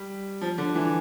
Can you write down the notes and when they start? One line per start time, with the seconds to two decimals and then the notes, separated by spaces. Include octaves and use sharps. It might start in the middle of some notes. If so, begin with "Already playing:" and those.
Already playing: G3
0.41 F3
0.58 D3
0.75 E3